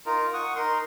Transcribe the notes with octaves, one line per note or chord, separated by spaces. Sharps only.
D#4 F4 A#4
F#5 C#6 D#6
D#4 A#4 C6